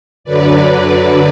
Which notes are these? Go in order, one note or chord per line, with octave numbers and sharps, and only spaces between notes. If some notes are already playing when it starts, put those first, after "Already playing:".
F#2 D3 F#3 B4 D5